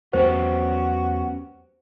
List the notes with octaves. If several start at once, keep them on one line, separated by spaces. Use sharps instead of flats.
E2 F#3 A3 B3 C#4 F#4 G4 C5